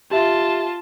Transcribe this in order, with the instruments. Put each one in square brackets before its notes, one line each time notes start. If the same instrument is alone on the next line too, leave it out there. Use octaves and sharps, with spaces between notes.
[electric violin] F4 A5 [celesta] G4 E5